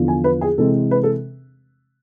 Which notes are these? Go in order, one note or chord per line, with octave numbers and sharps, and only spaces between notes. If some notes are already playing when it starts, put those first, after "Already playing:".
Already playing: E2 D3 F3 B3
G#5
B4
G#4
C3 E3 G#3 C4 A4
B4
A4